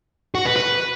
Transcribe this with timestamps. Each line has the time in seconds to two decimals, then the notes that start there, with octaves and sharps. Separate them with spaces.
0.35 F#4
0.46 B4
0.56 B4